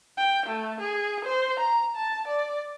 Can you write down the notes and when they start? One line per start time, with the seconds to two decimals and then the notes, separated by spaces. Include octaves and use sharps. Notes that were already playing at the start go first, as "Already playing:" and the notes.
0.17 G5
0.46 A3
0.80 G#4
1.25 C5
1.60 A#5
1.96 A5
2.28 D5